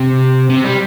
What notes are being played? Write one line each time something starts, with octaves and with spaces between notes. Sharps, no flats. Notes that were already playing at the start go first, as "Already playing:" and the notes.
Already playing: C3
C3
G3